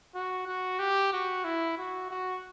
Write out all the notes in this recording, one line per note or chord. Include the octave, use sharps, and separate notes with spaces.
F#4
F#4
G4
F#4
E4
F#4
F#4